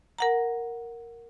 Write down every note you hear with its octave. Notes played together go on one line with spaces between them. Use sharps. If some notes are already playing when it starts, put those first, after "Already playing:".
A#4 F#5 A#5